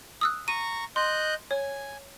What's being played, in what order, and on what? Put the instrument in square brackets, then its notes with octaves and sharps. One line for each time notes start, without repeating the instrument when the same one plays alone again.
[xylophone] D#6 E6 F#6
[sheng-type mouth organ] A#5 C#6 [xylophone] D#7
[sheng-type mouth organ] D#5 F#6 G6 [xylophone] C6
[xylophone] C#5 [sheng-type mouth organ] G#5